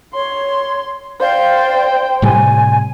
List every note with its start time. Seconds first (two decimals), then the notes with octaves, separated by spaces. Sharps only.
0.14 C#5 C6
1.20 C5 D5 F5 G5
2.22 A2 C3 G3 G#5